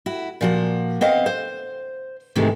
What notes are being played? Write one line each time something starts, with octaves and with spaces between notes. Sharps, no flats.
E4 F#4
A#2 F3 F#4
B3 C4 D#5 F5
C5
G#2 C3 D#3 E3 G#3 A3